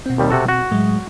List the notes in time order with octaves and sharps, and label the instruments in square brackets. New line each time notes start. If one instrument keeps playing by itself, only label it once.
[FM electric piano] B2 C4
[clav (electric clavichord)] D#2 D#3 G3
C3 F#4 A4
F#4
[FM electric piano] A2 F#3 G#3